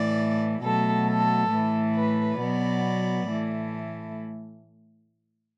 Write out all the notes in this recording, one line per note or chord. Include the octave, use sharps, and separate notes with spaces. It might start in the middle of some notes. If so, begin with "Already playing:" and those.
Already playing: A2 E3 A3 D5
B2 F#3 A3 A4
A4
A2 E3 A3
B4
B2 F#3 B3 D5
A2 E3 A3